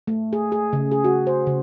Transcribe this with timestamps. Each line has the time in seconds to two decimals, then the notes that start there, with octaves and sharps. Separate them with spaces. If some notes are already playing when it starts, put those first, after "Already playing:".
0.07 A3
0.33 G#4
0.52 G#4
0.73 C#3
0.91 G#4
1.04 F#4
1.27 C5
1.47 C#3